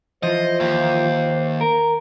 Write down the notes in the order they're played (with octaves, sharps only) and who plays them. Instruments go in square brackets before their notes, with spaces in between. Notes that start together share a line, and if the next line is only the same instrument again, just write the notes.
[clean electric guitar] E3 F3 F4 [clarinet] C5 [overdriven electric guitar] D#5
[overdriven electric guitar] D#2
[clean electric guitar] A#4